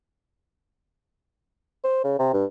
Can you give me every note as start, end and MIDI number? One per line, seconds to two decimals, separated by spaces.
1.84 2.03 72
2.04 2.18 49
2.19 2.30 48
2.33 2.45 43